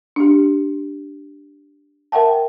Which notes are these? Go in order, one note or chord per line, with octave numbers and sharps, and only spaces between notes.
D4 G4
A#4 E5 F#5 G5 A5